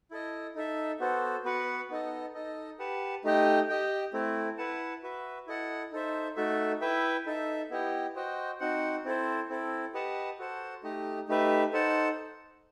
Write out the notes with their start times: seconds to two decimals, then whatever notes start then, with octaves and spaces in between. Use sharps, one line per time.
0.11 E4 A4 D#5
0.56 D#4 A4 E5
1.00 B3 F#4 A4 C5
1.45 B3 F#4 B4 F#5
1.89 B3 D#4 A4 D#5
2.34 D#4 A4 D#5
2.79 G4 B4 F#5 A5
3.24 A3 D#4 G4 D#5 G5
3.69 G4 D#5 G5
4.13 A3 C4 E4
4.58 E4 B4 F#5 A5
5.02 F#4 B4 E5
5.47 E4 A4 D#5 F#5
5.92 D#4 A4 C5 E5
6.36 A3 D#4 F#4 A4 E5
6.81 E4 B4 E5 G5
7.26 D#4 A4 E5
7.70 B3 E4 G4 D#5 G5
8.15 F#4 C5 D#5 G5
8.60 C4 D#4 F#4 C5 F#5
9.05 C4 E4 A4 C5
9.49 C4 E4 A4
9.94 G4 B4 D#5 F#5 A5
10.39 F#4 A4 C5 F#5 A5
10.83 A3 D#4 G4 D#5
11.28 A3 D#4 G4 B4 E5
11.73 D#4 A4 C5 F#5 A5